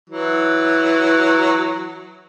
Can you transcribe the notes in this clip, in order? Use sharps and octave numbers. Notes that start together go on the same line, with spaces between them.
E3 F#3